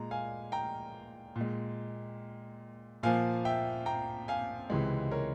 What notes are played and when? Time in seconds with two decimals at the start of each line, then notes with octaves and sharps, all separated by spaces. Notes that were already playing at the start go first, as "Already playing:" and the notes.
Already playing: A#2 G#3 A#5
0.11 F5 G#5
0.52 G5 A#5
1.36 A#2
1.41 G#3
3.03 A#2 F3 A#3 F5 G#5
3.45 E5 G5
3.86 G5 A#5
4.28 F5 G#5
4.70 C#2 C3 E3 G#3
5.11 A#4 C#5